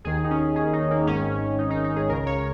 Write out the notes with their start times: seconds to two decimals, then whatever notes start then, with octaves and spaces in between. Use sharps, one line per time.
0.04 D#2 D#3 G#4
0.24 D#4
0.31 C#4
0.56 G#4
0.73 D#4
0.91 A#3
1.07 G#1 G#2 D#3 C#4
1.58 D#4
1.70 D#4
1.84 D#4
1.96 G#4
2.09 C#2 C#3 A#4
2.26 C#5